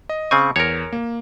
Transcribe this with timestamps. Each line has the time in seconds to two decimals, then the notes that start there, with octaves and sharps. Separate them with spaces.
0.09 D#5
0.31 C#3 C4 G#5 C#6
0.56 E2 A#4 C#5
0.92 A#3